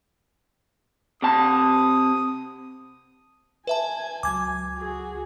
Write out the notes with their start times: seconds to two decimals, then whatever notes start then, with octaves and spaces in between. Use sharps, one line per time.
1.22 C3 A5 D#6
3.67 B4 E5 G#5 A5
4.23 C#2 F#3 D6 G#6
4.76 F#4 G#4